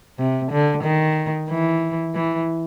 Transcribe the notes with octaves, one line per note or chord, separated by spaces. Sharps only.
C3
D3
D#3
E3
E3